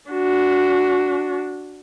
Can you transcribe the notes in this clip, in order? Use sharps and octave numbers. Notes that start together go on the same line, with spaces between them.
D4 F#4